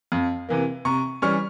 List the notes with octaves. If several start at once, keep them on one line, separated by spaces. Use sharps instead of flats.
F2
C3 E3 A#3
C3 A#5 C#6
E3 G3 C#4 C#6 F6